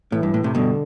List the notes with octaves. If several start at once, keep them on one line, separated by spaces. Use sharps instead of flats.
A2 E3
G2
A2
A2 C3
G2 B2 D3